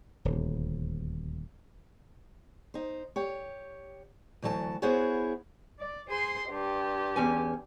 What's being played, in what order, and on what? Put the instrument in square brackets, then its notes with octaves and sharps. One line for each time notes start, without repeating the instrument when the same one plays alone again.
[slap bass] D#1 D2
[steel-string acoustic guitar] D#4 C5
G4 C#5
D2 E3 F#3 B4 A5
B3 E4 F#4 G#4 C5 C#5
[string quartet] D5
G#4 C5 C6
G2 G4
[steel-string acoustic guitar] E2 C#4 G#5